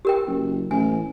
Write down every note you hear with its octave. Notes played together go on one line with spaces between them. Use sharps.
G4 A#4 G5
F#1
A1 G#5